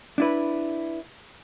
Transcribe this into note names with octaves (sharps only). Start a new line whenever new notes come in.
D4 E4 B4